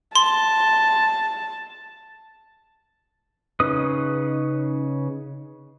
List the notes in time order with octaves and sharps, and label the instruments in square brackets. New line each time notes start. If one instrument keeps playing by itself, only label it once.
[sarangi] A5 [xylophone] C6
[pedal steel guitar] C#3 C#4 D#4 B4 D#6